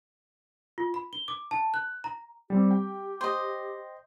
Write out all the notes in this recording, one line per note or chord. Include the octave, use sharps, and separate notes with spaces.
F4
B5
G7
D6
A5
F#6
A#5
G3 C4 G4
G5
C5 D#5